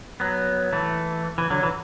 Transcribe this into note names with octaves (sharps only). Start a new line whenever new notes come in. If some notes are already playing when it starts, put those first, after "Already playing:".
F#3 B3
E3 A3
E3
D3 F#3
E3